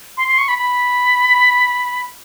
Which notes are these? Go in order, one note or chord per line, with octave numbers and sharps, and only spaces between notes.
C6
C6
C#6
B5
B5